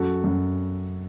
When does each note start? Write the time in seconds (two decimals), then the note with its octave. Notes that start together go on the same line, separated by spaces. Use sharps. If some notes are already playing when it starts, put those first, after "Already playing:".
Already playing: F#2 F#4 A4
0.24 F#2